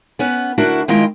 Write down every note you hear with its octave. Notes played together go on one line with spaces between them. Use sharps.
B3 C#4 B4
D2 D4 E4 F#4 A#4 E5
D#3 G#3 E4 F4 D#5 G5